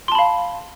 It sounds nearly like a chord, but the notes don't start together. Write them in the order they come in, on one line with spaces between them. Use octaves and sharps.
C6 A5 B5 F5